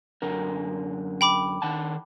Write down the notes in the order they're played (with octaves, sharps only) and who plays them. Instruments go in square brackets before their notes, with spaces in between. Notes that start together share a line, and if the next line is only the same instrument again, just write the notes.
[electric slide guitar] F#2 D3 A#4
[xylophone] G5 B5 D6
[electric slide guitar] D#3 F#5 A5